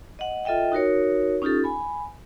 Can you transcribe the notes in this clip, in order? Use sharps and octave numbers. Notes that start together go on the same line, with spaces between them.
D#5 F#5
F4 A4 D#5 E5 G5
D#4 F#4 A#4 C#5
C#4 D#4 F4 G4 A4
G#5 B5